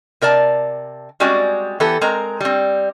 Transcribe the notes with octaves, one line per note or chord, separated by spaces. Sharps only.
C3 A#4 D5 A5
G3 G#3 C4 C#4 F#4 D5
E3 B3 G4 A4
G#3 C4 A#4 A#5
G3 C4